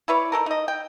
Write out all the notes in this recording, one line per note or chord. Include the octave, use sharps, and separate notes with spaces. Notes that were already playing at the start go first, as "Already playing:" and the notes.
E4 B4 C#5 D5
D#4 G4 A4 A#4
D#4 D#5
G5